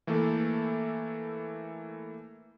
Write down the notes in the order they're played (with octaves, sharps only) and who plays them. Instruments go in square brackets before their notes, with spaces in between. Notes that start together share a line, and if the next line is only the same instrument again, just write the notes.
[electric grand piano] E3 A3 A#3 E4 A4